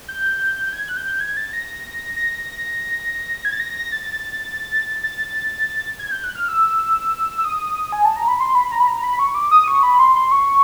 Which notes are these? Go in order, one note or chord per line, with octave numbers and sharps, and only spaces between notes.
G6
G6
G#6
F#6
G6
G#6
A6
A#6
A#6
G#6
A6
A#6
A#6
A6
A6
G#6
G6
F#6
F6
E6
E6
D#6
G#5
A5
A#5
B5
C6
B5
A#5
B5
A#5
B5
C#6
D6
D#6
C#6
B5
C6
C6
C#6